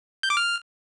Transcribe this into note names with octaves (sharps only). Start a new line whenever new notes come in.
G6
D6
F6